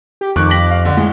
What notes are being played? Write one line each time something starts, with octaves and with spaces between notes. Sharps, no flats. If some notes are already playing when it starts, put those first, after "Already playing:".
G4
F2 D#3 C#6 D6 F#6
A#6 B6 F#7
F5
D3
A2 G#3